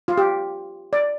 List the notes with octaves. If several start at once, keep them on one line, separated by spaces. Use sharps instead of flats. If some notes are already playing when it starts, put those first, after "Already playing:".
F4
G4
D5